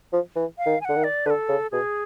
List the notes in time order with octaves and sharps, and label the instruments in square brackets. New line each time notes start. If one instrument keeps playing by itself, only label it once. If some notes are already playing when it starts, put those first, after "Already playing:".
[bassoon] F3
E3
[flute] F5
[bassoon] D#3
[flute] G#5
[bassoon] D3 [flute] F#5
[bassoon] D#3
[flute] D5
[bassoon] D3 [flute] B4
[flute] A4
[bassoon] C#3
[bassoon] B2 [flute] G#4